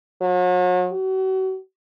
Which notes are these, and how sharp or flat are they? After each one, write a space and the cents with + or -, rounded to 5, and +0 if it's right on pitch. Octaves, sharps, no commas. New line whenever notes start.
F#3 -40
F#4 +40